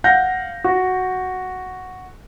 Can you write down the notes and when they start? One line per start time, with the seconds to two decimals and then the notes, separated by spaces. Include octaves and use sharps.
0.04 F5 F#5 G6 A#6
0.64 F#4